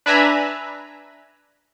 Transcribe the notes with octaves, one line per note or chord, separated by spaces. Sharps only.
D4 B4 E5 G#5 A#5 B5